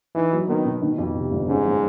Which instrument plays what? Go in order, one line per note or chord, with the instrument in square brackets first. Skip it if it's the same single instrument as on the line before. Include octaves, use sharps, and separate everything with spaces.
[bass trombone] E3 [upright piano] D#4
[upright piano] F#3
[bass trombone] D#3 [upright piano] B3
[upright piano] B2
D#3
F2
C3
G1
[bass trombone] G#2 [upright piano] C#4
[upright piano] F3